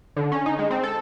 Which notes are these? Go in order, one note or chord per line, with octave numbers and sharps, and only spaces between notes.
D3
C#4
D#4
G#3
C4
A4